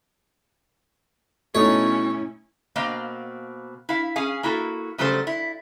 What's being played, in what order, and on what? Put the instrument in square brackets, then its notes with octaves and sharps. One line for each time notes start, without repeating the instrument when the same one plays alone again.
[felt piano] B2 [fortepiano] A3 D#4 [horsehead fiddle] C#4 E4 [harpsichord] C#5
[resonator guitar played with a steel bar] B2 A#3 C4 D#5 F5
E4 F5
C#4 G#4 F5 G#5
A#3 E4 F#4 A4
C#3 F#3 G3 A3 A4 C5
E4